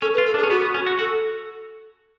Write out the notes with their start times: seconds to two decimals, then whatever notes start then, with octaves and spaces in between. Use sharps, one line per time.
0.01 C#4 A4
0.13 B4
0.18 F4
0.25 A4
0.34 D4
0.38 G#4
0.43 C#4
0.50 B3 F#4
0.62 B3
0.74 C#4
0.86 F#4
0.99 F#4 A4